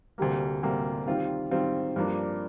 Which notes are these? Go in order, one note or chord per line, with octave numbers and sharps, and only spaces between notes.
D2 C3 G3 A#3
D2 C3 G3 A#3
D#3 G3 C4 F4
D#3 G3 C4 F4
G2 F3 A#3 D4